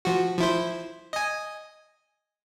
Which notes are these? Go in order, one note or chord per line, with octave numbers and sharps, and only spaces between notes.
F3 F#4
F3 E4 C5
D#5 G#5